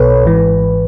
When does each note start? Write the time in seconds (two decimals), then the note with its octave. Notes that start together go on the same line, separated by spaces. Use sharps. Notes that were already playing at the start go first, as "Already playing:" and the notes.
Already playing: B1 B2 A4 B4 C#5
0.23 G#1 G#2 E3